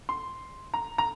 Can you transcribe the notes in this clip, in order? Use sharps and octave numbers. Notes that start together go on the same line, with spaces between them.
C6
A#5
A#5